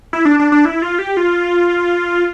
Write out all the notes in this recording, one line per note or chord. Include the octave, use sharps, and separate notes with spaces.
E4
D4
D4
D4
E4
F4
G4
F4